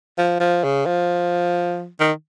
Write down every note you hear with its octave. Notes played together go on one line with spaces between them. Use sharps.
F3
F3
C#3
F3
D#3